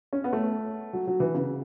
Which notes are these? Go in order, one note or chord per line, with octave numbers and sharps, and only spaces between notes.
C#4
B3
A3
F#3
F#3
E3
C#3